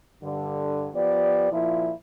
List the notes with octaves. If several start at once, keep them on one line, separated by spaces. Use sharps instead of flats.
G2 D3
F3 B3 G4 D5
A#2 F3 E4